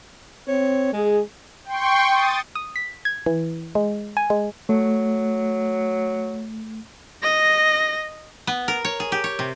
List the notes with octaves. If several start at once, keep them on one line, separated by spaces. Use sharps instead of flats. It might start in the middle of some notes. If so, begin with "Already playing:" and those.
C4 C#5
G#3 G#4
G5 C6 C#6
D#6 A6
D#6
B6
G#6
E3
G#3
G#5
G#3
F#3 A3
D#5 A#6
B3
A#4
C#5
G#4
G4
C#5
C3